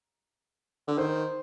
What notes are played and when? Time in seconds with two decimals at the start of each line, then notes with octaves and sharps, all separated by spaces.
0.88 D3
0.98 D#3 C5